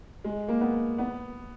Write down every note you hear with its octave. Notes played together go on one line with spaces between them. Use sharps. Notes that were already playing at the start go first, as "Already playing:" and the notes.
G#3
A#3
B3
B3